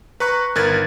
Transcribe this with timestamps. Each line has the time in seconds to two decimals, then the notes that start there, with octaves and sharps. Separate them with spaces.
0.20 B4 A#5 C#6 F#6
0.55 G1 D#3 A#4 B4 G#6 A6